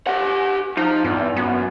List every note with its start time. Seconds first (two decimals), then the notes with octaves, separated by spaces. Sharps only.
0.07 G4 F#5
0.77 F3 D#4
1.04 E2 G2
1.36 F#2 B3